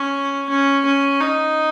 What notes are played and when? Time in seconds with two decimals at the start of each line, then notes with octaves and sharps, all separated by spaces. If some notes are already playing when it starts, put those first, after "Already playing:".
Already playing: C#4
0.49 C#4
0.85 C#4
1.21 D#4